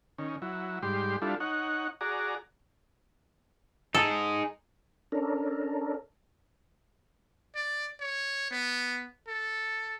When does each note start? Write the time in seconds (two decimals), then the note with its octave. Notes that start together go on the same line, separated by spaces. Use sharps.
0.18 D#3 C#4
0.42 F#3 E4
0.83 G#2 G3 G4 C6
1.22 G3 D4 E4 F4 A4
1.40 D#4 C#5 F#5
2.01 F#4 G#4 D5 A#5
3.95 D#4 G#4 A4
5.12 C#4 D4 A4 A#4
7.55 D5
8.00 C#5
8.51 B3
9.28 A4